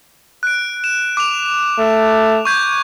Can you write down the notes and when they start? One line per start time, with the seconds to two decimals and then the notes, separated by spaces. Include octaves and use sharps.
0.43 F#6 D7
0.84 E7
1.17 D6 F7
1.79 A3
2.45 C#6 G6 G#6